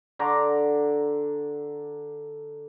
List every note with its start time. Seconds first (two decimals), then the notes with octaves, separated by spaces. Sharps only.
0.19 D3 A#5 C6 D6